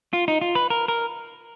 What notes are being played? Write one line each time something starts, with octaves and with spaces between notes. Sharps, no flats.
F4
D#4
F4
B4
A#4
A#4